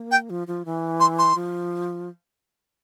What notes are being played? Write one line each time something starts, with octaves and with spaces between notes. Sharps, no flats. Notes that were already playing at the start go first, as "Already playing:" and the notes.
Already playing: A#3
G5
F3
F3
E3
C6
C6
F3